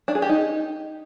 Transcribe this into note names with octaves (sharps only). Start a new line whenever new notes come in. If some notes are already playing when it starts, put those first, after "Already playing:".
D4
G#4
G4
D#4